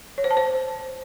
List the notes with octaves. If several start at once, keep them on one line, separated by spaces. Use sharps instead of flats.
C#5
C5
A5
C5